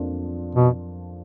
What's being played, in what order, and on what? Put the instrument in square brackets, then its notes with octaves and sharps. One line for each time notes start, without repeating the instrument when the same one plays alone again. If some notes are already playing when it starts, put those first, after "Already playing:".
Already playing: [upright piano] F2 F3 A#3 D4 F4
[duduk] B2